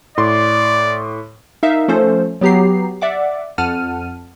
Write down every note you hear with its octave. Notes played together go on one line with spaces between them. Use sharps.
A2 D5 C6 D6
D#4 A#4 E5 F5
F3 A3 C#4 A4 C5
F#3 B3 G4 A#5 C7
D5 E5 F#5 D6
F2 F#5 A5 F6 D#7